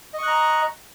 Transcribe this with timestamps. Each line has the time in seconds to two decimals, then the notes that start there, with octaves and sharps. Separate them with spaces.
0.14 D#5
0.18 C#6
0.23 F#6
0.27 A#5